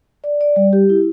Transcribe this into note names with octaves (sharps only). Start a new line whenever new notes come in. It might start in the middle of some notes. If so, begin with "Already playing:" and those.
D5
D5
G3
G4
E4